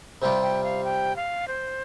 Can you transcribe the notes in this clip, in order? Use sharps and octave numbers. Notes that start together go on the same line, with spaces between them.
C3 G3 F4 G5
G5
F5
G5
F5
C5